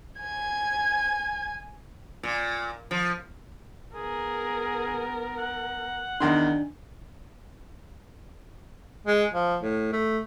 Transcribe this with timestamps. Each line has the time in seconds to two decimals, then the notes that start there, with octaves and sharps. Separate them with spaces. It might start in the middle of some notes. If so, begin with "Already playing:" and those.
0.20 G#5 G#6
2.23 A#2
2.91 F3
3.95 B3 G#4 A#4
5.38 F#5
6.20 E2 D#3 D4 C6
9.06 G#3
9.33 F3
9.63 A2
9.93 A3